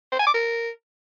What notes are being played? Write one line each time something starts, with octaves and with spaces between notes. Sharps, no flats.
C5
G#5
D6
A#4